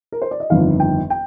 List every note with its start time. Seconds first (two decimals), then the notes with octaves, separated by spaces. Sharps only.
0.12 A#4
0.22 C5
0.31 D5
0.40 D#5
0.50 G1 F2 D#3 F5
0.80 G5
1.10 G5